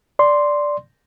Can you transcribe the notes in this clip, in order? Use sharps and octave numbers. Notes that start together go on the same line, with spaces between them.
D5 C6